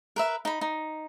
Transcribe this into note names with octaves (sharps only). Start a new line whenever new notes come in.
A#4 B4 E5
D#4 B5
D#4